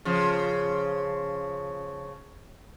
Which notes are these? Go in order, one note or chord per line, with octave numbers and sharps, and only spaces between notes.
C#3 F3